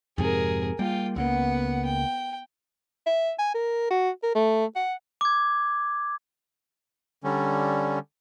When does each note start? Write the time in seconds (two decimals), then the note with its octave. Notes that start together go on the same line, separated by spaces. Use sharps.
0.18 F2 G#2 C3 G#4 A#4
0.79 G3 A#3 F4 G5
1.16 C#2 C#3 A#3 B3 F#5
1.85 G5
3.06 E5
3.39 G#5
3.55 A#4
3.91 F#4
4.23 A#4
4.35 A3
4.76 F#5
5.21 D6 G#6
7.24 D3 G3 C#4